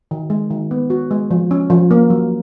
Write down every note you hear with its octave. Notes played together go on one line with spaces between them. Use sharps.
D#3
G#3
D#3
B3
F#4
G#3
F3
C#4
F3
A#3
F#3